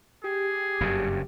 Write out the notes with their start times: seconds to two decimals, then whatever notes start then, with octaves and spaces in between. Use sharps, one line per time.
0.24 G4 G#4
0.81 F#1 G2 C#3